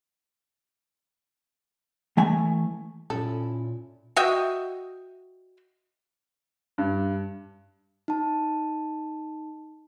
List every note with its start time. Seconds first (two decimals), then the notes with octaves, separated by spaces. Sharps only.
2.17 E3 A3 G#5
3.10 A#2 C#4 E4 A4
4.16 F#4 D#5 E5 G5
6.78 G2
8.08 D#4 A5